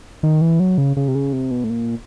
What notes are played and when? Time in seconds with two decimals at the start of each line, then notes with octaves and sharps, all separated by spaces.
0.23 D#3
0.41 E3
0.60 F#3
0.78 C#3
0.97 C#3
1.08 C3
1.15 C#3
1.33 C3
1.51 B2
1.64 A2
1.70 A#2